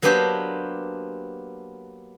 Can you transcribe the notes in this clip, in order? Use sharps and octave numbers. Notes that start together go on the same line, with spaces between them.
F#3 A#3 B3 D4 G4 C5